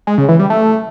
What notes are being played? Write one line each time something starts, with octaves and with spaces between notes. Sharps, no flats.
G#3
C#3
E3
G3
A3